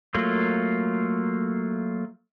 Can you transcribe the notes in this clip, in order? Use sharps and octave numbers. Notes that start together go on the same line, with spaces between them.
F#3 A3 A#3 F4